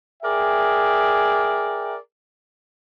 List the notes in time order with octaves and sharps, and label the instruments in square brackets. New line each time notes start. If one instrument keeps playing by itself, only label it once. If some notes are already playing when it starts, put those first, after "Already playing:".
[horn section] G#4 A#4 D5 E5 G5